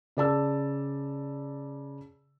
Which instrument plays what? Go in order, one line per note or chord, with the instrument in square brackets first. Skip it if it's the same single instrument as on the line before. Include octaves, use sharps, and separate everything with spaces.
[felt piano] C#3 D5 A5 E6